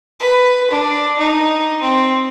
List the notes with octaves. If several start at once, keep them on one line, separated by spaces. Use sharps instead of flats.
B4
D4
D#4
C4